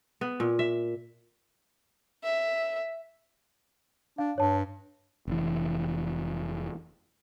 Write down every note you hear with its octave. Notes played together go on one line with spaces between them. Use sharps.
B3
A#2
E5
E5
D4 F5
G2 C#5 A5
F1 E3